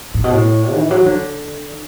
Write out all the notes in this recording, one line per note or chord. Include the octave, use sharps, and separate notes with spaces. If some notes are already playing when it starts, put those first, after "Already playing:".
A2
B2
A2
E3
F#3
D3